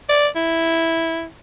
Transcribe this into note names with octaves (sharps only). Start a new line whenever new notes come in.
D5
E4